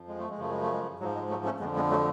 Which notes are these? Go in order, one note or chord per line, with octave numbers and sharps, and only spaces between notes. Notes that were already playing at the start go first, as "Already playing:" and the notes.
Already playing: F2 F3
G#3
A3
G#3
F#2 C#3 F3 A3
G#3
A3
G#3
G#2 F3 F#3
G#3
F#3 A3
A3 C#4
F2 D3 F3 G#3 B3
G#3 B3
F#3 A3